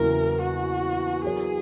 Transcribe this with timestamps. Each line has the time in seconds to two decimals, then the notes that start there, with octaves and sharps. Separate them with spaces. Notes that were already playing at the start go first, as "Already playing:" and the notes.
Already playing: E2 C#3 F#3 A#3 E4 A#4
0.41 F#4
1.24 F#3 B3 E4 G#4 A#4 C#5